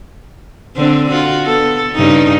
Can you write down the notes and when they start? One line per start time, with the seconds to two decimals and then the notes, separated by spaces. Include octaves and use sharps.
0.76 D3 C4 D4
1.11 F4 F#4
1.46 B3 A4
1.93 G2 C#3 D#4